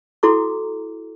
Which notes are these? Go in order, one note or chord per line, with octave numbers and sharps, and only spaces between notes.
E4 F#4 A4 A#5 D6